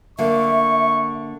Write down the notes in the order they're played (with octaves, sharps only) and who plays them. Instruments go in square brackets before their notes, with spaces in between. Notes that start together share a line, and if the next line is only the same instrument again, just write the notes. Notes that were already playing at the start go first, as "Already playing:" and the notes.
[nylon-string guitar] D3 A#3 [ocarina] E5 [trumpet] C#6